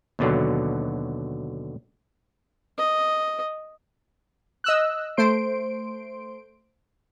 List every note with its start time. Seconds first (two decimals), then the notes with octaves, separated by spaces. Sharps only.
0.19 D#2 B2 D3 F#3
2.78 D#5
4.64 D#5 E6 F#6
5.17 A3 C5 C6 D7